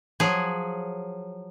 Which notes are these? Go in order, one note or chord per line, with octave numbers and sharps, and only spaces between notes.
F3 F#3 G#4